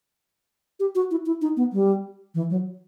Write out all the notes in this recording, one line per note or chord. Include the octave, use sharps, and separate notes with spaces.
G4
F#4
E4
E4
D#4
B3
G3
E3
F#3